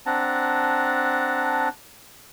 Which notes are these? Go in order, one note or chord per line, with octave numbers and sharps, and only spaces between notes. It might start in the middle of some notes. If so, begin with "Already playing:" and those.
C4 D4 F#5 A5 A#5